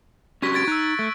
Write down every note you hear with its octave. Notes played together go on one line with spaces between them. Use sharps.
C#4 F#4 G4 C#6 G#6 B6
G#6 A6 D7
D#4 E6 F#6
A3